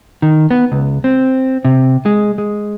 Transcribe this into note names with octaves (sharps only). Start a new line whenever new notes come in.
D#3
B3
C#2
C4
C3
G#3
G#3